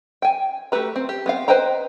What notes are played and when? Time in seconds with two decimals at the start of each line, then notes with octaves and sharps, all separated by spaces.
0.22 G5 G#5
0.72 A3 F#4 G4 B4 A#5
0.96 C4
1.09 G4
1.26 B3 C4 F5
1.48 B4 C5 D#5 G5 A#5